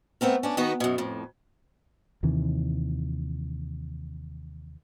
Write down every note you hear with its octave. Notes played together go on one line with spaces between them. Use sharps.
A3 B3 C4 A#4
C#4 D4
D#3 B3 D#4 F#4 B4
F#2 B2
F2 A2
D#2 C3 D#3 E3